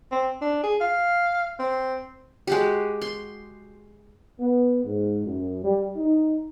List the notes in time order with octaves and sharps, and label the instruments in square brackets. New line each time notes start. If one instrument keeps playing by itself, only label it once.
[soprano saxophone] C4
D4
G#4
F5
C4
[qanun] G#3 F#4 G4
C6
[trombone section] B3
G#2
F#2
G3
D#4